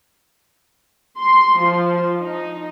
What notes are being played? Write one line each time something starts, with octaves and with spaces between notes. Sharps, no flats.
C6
F3
D#4